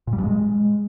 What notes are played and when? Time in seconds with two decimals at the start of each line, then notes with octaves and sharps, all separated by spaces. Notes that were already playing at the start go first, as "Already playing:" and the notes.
0.07 A#2
0.13 G3
0.18 G2
0.24 G#3